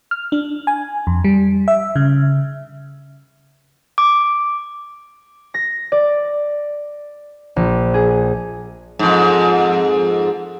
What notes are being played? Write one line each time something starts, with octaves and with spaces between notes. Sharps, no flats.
F6
D4
G#5
F2
G3
E5
C#3
D6
A#6
D5
A#1
G#4
F2 G#2